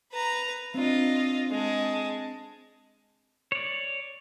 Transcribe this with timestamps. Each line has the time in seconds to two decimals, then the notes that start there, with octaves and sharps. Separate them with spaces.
0.13 B4 A#5
0.75 C4 D4 F4 D#5
1.51 G#3 A5
3.52 C#5 D5